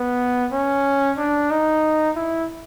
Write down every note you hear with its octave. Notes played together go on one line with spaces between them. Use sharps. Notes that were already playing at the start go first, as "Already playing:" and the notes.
Already playing: B3
C#4
D4
D#4
E4